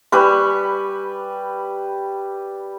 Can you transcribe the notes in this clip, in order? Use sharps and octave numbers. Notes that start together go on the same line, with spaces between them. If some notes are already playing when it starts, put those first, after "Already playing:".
G3 B4 C#6